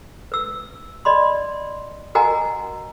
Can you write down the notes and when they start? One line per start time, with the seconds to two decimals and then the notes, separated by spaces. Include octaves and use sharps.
0.32 B4 E6
1.05 D5 D#5 B5 C6
2.15 F#4 A#4 D#5 F#5 G#5 A#5